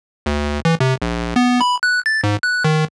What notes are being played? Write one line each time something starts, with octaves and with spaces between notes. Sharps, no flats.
D2
E3
C3
A#1
B3
B5
F#6
A6
G#2
F#6
D#3